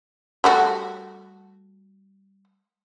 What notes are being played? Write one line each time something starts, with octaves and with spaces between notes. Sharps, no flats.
G3 A3 F#4